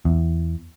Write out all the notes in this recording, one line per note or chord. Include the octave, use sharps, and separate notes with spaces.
E2